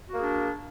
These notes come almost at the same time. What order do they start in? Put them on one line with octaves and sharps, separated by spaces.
F#4 A#3 G#4 D4